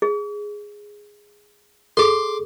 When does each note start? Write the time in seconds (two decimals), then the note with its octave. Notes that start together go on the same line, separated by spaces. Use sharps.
0.02 G#4
1.97 G#4 A4 C6 D6